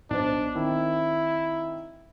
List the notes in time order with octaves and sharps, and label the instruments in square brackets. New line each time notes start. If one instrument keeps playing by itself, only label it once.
[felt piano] B1 C5 [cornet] D4
[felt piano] D#3 C4 [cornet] E4